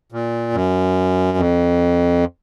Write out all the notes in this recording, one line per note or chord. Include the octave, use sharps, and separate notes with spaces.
A#2
F#2
F2